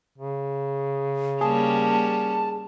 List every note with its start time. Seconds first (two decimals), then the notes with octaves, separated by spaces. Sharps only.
0.18 C#3
1.41 G3 A#3 C#4 G#4 A5